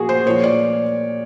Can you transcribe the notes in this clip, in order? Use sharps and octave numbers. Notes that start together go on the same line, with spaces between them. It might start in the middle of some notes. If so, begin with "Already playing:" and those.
Already playing: A#2 F3 F#4 G#4
C5
A#2 F3 C#5
D5